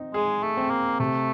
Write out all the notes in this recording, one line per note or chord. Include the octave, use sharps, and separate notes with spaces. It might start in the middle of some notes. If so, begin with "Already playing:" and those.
Already playing: C4 D#4
G#3 G#4
A3
C4
A#3
C3 A3